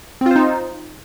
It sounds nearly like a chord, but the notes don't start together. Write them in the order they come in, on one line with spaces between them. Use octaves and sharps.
C4 F4 C5 D#4